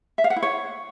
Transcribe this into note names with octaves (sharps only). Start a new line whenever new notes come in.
E5
F5
F#5
E4
C#5